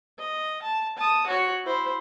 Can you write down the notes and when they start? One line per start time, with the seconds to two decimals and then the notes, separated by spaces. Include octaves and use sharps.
0.19 D#5
0.62 A5
0.97 A5 D#6
1.27 F#4 C#5
1.64 E4 C5